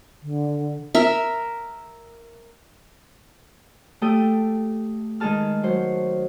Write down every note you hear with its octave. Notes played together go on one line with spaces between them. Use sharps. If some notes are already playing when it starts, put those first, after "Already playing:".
D3
A#4 E5
A3 G4 A4 G5 D#6
D#3 G#3 D#4 G#4 A5 F6
F#3 C5